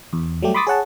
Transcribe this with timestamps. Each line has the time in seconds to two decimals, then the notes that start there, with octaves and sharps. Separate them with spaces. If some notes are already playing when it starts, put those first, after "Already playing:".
0.13 E2
0.42 F#3 G3 A3 G4
0.54 B5 C6 D6 D#6 A6 B6
0.67 G#4 C#5 F#5 A5